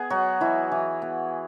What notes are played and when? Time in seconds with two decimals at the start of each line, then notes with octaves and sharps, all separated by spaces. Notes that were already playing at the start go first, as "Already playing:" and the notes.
Already playing: B3 G#4
0.10 F#3 F#4
0.41 E3 E4
0.72 E3
1.02 B3